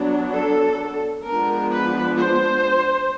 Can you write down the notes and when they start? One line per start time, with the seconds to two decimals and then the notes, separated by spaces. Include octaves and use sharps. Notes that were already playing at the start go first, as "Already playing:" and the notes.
Already playing: F#3 B3 D4
0.34 A4
1.26 F3 G#3 B3 D4 A#4
1.71 B4
2.17 C5